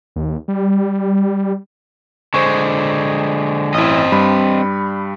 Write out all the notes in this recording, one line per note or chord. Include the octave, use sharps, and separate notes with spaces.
D#2
G3
D3 G#3 C5 C#6
A1 C4 E4 D#5
G2 G3 B5